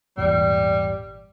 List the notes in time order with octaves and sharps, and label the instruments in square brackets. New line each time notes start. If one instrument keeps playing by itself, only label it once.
[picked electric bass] G#1 E2 A#2 [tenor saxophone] G3